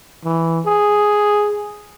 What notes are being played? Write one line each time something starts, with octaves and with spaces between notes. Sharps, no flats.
E3
G#4